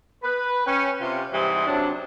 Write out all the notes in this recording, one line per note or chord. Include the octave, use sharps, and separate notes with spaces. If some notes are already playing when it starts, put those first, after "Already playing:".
B4
C#4 G5
C3 F4
G#2 C3 E3 G3 C4 G#4
F#2 C3 F#3 D4